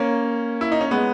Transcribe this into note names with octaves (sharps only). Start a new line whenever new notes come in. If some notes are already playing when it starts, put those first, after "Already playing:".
Already playing: A#3 C#4
E4
D#4
C#4
G#3 B3